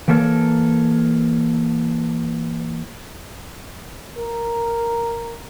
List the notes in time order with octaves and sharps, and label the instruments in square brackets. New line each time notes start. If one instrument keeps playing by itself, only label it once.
[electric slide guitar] E3 A#3 A4 A#4 C#5
[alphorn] A#4